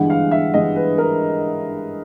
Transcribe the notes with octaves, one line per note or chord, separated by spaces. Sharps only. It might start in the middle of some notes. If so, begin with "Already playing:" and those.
Already playing: G1 G2 E3 G#3 F#5
F5
E5
G1 G2 E3 G#3 D#5
B4
A#4